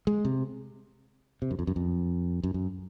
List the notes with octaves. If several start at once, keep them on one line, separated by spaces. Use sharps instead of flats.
G#3
C3
C3
F#2
F2
F#2
F2
F#2
F#2